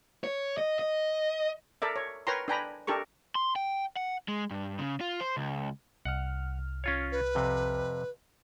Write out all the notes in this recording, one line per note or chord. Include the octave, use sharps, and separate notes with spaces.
C#5
D#5
D#5
A4 A#4 D5 E5
C#5
A#4 B4 C#5 G5 A#5 C6
D4 B4 G5 G#5 A#5 B5
D4 G4 A4 A#4 C#6
C6
G5
F#5
G#3
G2
C#3
F4
C5
C#2
C2 F#5 F6
C#4 F4 C#5
B4
F2 C3